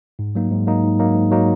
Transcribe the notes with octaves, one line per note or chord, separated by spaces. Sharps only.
G#2
F#3 A#3 D#4
G#2
F#3 A#3 D#4
G#2
F#3 A#3 D#4
G#2
F#3 A#3 D#4